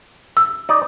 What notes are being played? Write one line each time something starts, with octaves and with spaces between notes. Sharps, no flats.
E6
D#4 D5